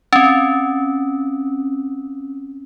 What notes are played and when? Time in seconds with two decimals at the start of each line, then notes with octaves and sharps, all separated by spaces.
0.13 C4 C#4